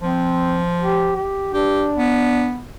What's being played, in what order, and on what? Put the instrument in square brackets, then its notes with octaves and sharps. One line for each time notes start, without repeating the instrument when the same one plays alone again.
[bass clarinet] F3 [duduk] C4
[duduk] G4
G4
[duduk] D4 [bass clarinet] G4
[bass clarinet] B3